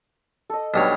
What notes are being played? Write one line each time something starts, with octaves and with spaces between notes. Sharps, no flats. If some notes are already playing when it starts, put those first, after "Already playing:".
A4 D#5
B1 G2 C#5